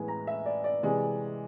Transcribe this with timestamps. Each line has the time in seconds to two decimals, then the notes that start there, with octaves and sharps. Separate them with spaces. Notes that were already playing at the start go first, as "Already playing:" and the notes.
Already playing: A2 E3 G#3 B3 G#5
0.08 A#5
0.27 E5
0.46 D5
0.64 D5
0.83 C3 E3 G#3